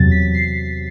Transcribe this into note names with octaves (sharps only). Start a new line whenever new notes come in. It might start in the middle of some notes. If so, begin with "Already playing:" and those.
Already playing: E2 C3 F#3 A6
B6
C7